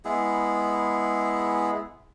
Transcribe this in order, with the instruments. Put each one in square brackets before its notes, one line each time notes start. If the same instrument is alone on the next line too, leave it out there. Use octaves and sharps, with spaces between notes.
[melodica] G#3 B3 E4 G#4